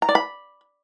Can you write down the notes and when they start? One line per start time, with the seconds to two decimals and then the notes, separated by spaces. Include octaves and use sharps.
0.02 A#5
0.09 D5
0.15 B5